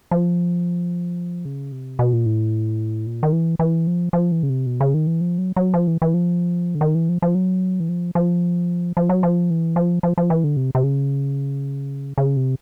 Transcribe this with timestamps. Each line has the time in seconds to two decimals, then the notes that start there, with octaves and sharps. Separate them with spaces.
0.11 F3
1.45 C#3
1.72 C3
1.99 B2
2.13 A#2
2.26 A2
3.07 A#2
3.23 D#3
3.33 E3
3.59 E3
3.87 F3
4.13 F3
4.32 E3
4.43 C#3
4.50 C3
4.66 B2
4.80 C#3
4.94 D#3
5.07 E3
5.21 F3
5.38 F#3
5.56 F#3
5.74 F3
5.87 E3
6.02 E3
6.14 F3
6.75 D3
6.81 D#3
6.95 E3
7.09 F3
7.22 F3
7.35 F#3
7.80 E3
7.89 F3
8.15 F3
8.97 F3
9.09 F#3
9.23 F3
9.50 E3
9.76 F3
10.03 F3
10.18 F3
10.30 E3
10.44 D3
10.57 C3
10.75 C3
10.83 C#3
12.18 C#3
12.37 C3